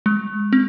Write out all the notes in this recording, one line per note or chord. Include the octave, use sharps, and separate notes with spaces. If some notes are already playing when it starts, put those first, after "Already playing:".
G#3
C4